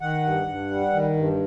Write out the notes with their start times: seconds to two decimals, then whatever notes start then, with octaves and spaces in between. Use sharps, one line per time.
0.01 D#3 F#5
0.24 G2
0.47 G2
0.71 G3
0.93 D#3
1.17 G2